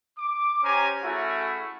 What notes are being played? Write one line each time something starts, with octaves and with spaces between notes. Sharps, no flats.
D6
C#4 G4 C5 G#5 A#5
A3 C#4 E4 F#4 G#4 E5